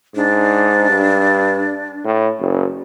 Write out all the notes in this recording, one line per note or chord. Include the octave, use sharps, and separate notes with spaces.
G#2 D4
G2
A2
F#1